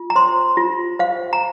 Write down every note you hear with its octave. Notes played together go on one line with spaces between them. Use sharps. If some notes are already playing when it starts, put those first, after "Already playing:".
Already playing: F4
A#5
C5 C6
F4
C5 F5
A#5